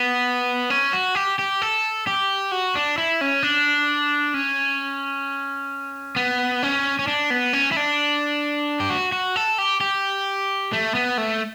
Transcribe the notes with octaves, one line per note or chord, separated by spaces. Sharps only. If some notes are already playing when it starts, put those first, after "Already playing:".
Already playing: B3
C#4
F#4
G4
G4
A4
G4
F#4
D4
E4
C#4
D4
C#4
B3
C#4
C#4
D4
B3
C#4
E4
D4
G4
F#4
F#4
A4
G4
G4
A3
B3
A3